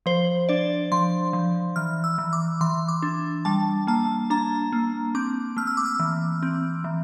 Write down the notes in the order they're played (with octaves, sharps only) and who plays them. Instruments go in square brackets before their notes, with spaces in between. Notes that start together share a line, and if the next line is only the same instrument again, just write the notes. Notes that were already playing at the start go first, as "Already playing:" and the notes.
[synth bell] F3 C5
D4 D5
F3 C6
F3
E3 F6
E6
E3
D6
E3 C6
D6
D4
G3 A5
A#3 A5
D4 A#5
A#3
C4 D6
A3 F6
E6
D6
E6
E3
C4
E3